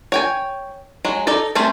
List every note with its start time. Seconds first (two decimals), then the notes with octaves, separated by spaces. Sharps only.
0.12 C#5 G5 G#5
1.05 F#3 G#3
1.27 D#4 A4 D5
1.55 A3 C4 C#4 C5